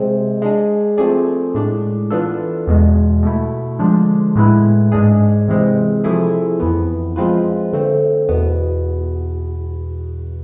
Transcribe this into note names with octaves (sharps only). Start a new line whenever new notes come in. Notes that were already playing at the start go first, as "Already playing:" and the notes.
Already playing: C3 G#3 C4
G#3 D4 G#4
F3 A3 C4 G#4 D5
A2 G#3 D4
E3 B3 D4 F4 A4
E2 B2 G#3
B2 A3 E4
D3 F3 G#3 D4
A2 G#3 B3 E4 B4
G#2 G#3 D4 G#4
C3 E3 G#3 C4
C3 F3 A3 E4 G#4
F2 E3 B3
F3 G#3 C4 F4 B4
D3 A3 C4
E2 B2 B3